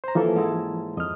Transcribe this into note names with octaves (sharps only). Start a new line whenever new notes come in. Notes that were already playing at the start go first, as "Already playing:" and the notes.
C5 A#5
E3 F3 A#3 C#4 A4 A#4
G#2 E4 A5
F2 D#5 F6